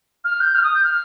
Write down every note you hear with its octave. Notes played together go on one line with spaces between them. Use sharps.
F6
G6
F6
D#6
G6
F6